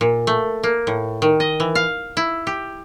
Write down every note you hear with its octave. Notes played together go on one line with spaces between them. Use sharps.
A#2
A3
A#3
A2
D#3
D#5
E3
F5
E4
G4